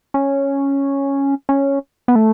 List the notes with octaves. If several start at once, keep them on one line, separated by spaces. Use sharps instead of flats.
C#4
C#4
B3
A3